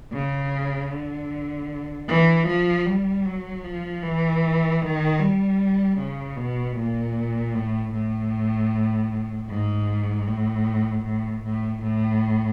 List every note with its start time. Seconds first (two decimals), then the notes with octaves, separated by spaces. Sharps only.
0.13 C#3
0.91 D3
2.08 E3
2.47 F3
2.86 G3
3.26 F#3
3.64 F3
4.03 E3
4.82 D#3
5.20 G3
5.99 C#3
6.37 B2
6.77 A#2
7.55 A2
7.93 A2
9.49 G#2
10.28 A2
11.05 A2
11.44 A2
11.83 A2